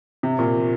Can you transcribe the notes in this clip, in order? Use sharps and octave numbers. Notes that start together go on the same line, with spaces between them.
C3
A#2